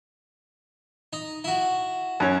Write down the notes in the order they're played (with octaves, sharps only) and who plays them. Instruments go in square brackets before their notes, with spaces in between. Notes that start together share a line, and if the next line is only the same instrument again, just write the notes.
[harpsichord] D#4
E4 F#4
[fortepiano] F#2 C#4